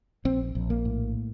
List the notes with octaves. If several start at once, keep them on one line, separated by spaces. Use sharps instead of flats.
A#1 C4
A#1
A#3
A2